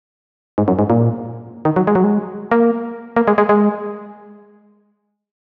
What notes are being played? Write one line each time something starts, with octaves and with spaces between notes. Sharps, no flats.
G#2
F#2
G#2
A#2
D#3
F#3
G#3
F#3
G#3
A#3
A#3
G#3
G#3
G#3